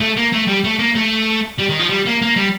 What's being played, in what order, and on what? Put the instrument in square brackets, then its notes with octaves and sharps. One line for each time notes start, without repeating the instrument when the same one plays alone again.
[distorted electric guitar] A3
A#3
A3
G3
A3
A#3
A3
G3
D#3
F3
G3
A#3
A#3
G3